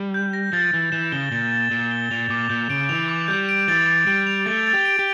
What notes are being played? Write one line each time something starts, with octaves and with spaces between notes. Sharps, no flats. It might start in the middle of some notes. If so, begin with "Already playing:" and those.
Already playing: G3
G6
A#6
F3 A6
E3 A6
E3 E7
C#3 G7
A#2 A6
A6
A#2 E7
G7
A#2 F7
A#2 D6
A#2 G6
C#3 D7
E3 F7
D6
G3 G6
D7
E3 A6
A6
G3 D7
F7
A3 A6
A6
G4
D7
G4